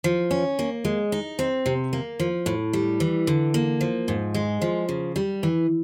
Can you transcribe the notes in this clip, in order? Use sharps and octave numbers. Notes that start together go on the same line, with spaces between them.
F3
C#4
A#3
G#3
D#4
C4
C3
A#3
F3
A2
G3
E3
D3
A#3
F3
G#2
G#3
F3
C#3
G3
E3